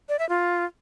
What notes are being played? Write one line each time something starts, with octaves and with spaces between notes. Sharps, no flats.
D5
E5
F4